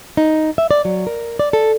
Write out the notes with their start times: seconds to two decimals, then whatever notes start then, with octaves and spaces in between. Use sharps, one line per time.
0.17 D#4
0.58 E5
0.71 D5
0.85 F#3
1.07 A#4
1.39 D5
1.53 A4